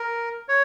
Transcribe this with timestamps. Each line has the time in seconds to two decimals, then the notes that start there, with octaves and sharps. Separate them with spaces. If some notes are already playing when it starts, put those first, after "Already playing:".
Already playing: A#4
0.49 C#5